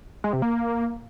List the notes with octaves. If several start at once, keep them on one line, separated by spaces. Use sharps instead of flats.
G#3
C3
A#3